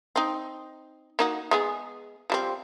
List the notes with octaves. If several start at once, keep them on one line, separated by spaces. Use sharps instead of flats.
C4 D#4
A#3 D#4 F#4
G#3 B3 G#4
F3 G3 C4